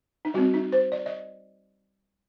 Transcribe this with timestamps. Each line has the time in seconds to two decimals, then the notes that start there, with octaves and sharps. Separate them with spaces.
0.25 D#4
0.34 G3 C4 F#4
0.54 D#4
0.72 C5
0.92 D5
1.06 D#5